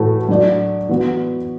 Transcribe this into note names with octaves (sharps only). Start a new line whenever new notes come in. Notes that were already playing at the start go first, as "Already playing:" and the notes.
Already playing: A2 E3 A3 F#4
F#3 D4 F#4 D5
E3 B3 F#4